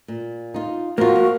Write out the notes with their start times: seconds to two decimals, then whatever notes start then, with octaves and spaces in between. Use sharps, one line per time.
0.08 A#2
0.54 D#4 F4
0.98 F3 A#3 F4 F#4 A#4
1.16 A#3